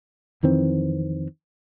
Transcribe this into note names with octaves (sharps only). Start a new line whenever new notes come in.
F2 D#3 E3 C4